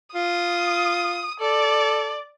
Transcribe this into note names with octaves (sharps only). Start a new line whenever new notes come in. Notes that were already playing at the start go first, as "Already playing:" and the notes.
F4 D#6
A4 D5